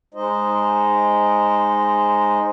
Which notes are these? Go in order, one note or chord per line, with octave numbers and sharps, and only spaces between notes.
G#3 D#4 C5 D#5